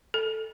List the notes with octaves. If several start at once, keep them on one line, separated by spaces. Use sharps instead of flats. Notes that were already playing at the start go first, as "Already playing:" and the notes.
A4